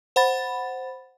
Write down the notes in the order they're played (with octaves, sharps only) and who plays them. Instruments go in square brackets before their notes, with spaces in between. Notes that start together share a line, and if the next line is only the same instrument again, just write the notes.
[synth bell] C5 F#5 B5 A6